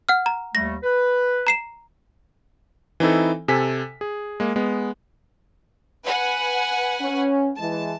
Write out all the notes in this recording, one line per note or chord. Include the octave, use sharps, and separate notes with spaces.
F#5 F6
A#5
D#2 G3 A3 A#6
B4
A#5 C7 E7
E3 C4 D#4 E4 A4
C3 A4 G#5 B6
G#4
G#3 A#3
G#3 B3
B4 F#5 G#5
C#4
E3 G#3 A5